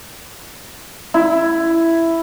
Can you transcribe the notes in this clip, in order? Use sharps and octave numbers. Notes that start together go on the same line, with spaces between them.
E4